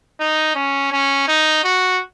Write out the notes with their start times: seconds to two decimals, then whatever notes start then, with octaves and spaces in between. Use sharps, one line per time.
0.20 D#4
0.55 C#4
0.92 C#4
1.28 D#4
1.64 F#4